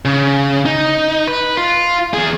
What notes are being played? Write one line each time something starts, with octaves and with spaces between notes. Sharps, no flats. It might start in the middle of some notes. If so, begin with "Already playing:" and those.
C#3
D#4
B4
F4
E2 G#4